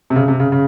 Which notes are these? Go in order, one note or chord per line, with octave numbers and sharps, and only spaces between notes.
C3
C#3
C3
C#3
C#3